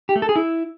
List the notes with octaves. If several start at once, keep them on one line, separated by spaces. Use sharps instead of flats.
G4
A3
A4
G#4
E4